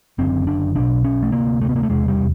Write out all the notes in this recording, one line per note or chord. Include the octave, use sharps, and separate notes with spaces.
F#1 F#2 D3 C4
D4
B1 B2 D4
C#4
A3
D2 C3 A#3
A3
B3
A#3
A3
E1 E2 C3 G#3
G3